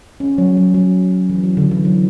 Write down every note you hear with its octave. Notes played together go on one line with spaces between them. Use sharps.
C#4
F#3
F#3
F#3
E3
F#3
D3
E3
F#3